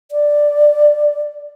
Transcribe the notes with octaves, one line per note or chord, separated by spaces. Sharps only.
D5